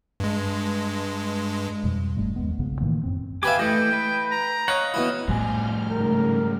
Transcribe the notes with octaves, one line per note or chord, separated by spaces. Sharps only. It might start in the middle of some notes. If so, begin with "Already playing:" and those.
G2 G#3
F2 B2 G3
F1 G2 G3 A3
D#2 G#3 B3
A#1 G2 C#3 B3
A2 D#3 E3 A#3
F#2 C4
G4 B4 E5 F5 G#5 D6
E3 A3 D#5 G5
B4
A#5
C#5 D#5 F5 F#5
B2 E3 E4
A2 F3 G3 G#5 F6 G6
G#2 C#3 A3 A#4